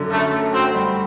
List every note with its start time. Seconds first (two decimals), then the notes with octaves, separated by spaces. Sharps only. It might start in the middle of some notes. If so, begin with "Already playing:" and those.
Already playing: F#2 D3
0.10 F#2 A3
0.31 A3
0.52 C4 F#4
0.74 G3